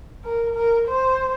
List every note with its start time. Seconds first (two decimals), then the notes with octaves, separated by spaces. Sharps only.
0.25 A#4
0.55 A#4
0.88 C5